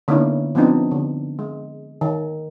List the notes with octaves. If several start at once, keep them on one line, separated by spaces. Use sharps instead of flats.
D3 A#3 B3 C#4 D#4 E4
F3 B3 C4 D4 D#4
D3
G#3
D#3